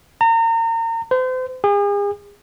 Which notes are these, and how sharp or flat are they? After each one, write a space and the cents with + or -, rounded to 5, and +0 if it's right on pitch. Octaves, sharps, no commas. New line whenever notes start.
A#5 -35
C5 -35
G#4 -40